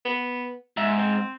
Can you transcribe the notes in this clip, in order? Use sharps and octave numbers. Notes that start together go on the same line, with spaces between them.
B3
G#2 E5
C4